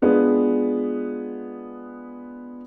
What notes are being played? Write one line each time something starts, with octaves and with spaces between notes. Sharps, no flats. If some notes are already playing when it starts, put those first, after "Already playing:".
G#3 B3 D4 F4 G#4 B4